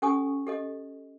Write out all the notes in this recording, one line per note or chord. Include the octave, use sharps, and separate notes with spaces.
C#4 G4 A4 G#5 C#6 D#6
G4 A4 D#5